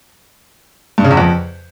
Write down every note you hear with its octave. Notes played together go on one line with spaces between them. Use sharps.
G2
C#3
E2
F2